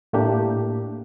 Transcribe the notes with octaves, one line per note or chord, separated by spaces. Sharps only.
A2 A3 A#3 D4 G4